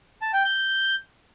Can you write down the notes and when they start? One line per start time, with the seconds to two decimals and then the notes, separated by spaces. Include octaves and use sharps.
0.22 A5
0.33 G5
0.45 G6